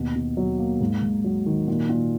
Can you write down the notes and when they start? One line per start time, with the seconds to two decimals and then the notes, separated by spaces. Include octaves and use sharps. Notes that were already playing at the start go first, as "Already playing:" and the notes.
Already playing: D#2 B2
0.15 B2
0.37 F#3
0.59 A#3
0.81 G#2
1.02 G#2
1.24 F#3
1.46 D#3
1.68 A#2
1.89 A#2